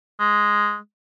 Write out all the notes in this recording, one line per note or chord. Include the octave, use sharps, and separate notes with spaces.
G#3